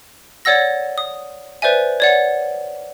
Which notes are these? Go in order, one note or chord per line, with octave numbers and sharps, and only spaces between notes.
C#5 D5 F#5 E6 A#6
D#6
B4 C5 D5 E5 G#5
C#5 D5 F#5